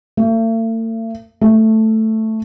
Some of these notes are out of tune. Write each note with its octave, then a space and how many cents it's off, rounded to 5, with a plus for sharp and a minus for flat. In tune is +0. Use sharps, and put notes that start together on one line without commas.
A3 +45
A3 +5